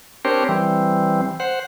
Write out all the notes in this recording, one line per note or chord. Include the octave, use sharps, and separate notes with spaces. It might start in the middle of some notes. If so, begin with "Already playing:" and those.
C4 D4 G4 A#4 C5 C#5
E3 G3 C4
C5 F#5